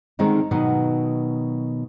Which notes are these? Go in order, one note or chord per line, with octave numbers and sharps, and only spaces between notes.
D3 D#3 G#3 C4 C#4 D#4
B2 D#3 F#3 B3